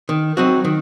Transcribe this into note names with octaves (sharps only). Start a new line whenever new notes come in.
D#3
F#3 C4 D#4 F#4
D#3